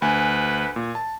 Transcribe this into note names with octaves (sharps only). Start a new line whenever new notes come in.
D2 B4 G#5
A#2
A5